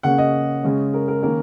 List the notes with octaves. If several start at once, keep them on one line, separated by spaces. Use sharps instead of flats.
C#3 A#3 C#4 F#5
D#5
C#3 G#3 C#4
A#4
A#4
D#3 A#3 C#4 A#4